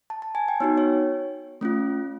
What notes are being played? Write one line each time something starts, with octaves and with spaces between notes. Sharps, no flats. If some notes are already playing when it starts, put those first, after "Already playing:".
A5
A5
G#5
G5
B3 D#4 F#4 C#5
C#5
A3 C#4 F4